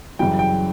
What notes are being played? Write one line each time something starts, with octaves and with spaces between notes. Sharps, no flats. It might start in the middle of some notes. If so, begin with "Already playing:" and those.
F#2 C#3 E3 G3 G5
G5